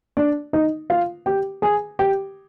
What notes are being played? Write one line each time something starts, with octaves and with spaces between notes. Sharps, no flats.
D4 D5
D#4 D#5
F4 F5
G4 G5
G#4 G#5
G4 G5